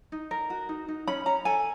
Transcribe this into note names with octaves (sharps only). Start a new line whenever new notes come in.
D#4
A#4
F#4
D#4
D#4
C#4 B5
C#4 A#5
A4 G#5